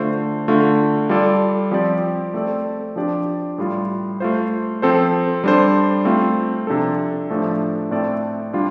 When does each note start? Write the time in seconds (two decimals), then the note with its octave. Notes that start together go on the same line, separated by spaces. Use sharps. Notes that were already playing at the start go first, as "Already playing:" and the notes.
Already playing: D3 A3 F4 C5
0.48 D3 A3 F4
1.09 G3 F4 A4 D5
1.71 F3 C4 G4 D5
2.34 A3 C4 A4 D5
2.96 F3 D4 G4 D5
3.58 A2 G3 F4
4.20 A3 F4 C5
4.82 F3 C4 A4 C5
5.44 G3 D4 A4 C5
6.05 A3 C4 F4
6.67 C3 F3 D4 A4
7.30 A2 F3 A3 D4 A4
7.91 A2 A3 C4 A4 D5
8.53 G3 D4 F4